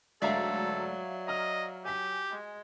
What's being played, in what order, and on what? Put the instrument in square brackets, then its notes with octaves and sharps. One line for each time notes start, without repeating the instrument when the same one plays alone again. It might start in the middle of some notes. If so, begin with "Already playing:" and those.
[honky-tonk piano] D2 G#2 A#5 [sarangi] F#3 [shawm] A4 [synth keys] D5 E5 F5
[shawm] D#5 [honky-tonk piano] A#5 F6
[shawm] G4 [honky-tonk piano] G#5 B6
[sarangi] G#3